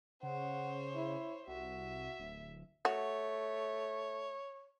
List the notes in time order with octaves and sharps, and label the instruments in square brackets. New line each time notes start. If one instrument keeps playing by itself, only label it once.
[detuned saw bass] C#3 [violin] C5 C#5 [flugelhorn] F#5
[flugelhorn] E4
[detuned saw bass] C2 [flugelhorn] F#4 [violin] E5
[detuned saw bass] D1
[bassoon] A3 [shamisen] F#4 [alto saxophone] C#5